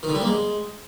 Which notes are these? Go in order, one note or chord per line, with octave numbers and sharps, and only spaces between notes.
D#3
D3
G3
A#3
G#3